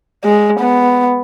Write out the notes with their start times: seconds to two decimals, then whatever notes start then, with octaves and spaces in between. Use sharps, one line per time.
0.24 G#3
0.60 B3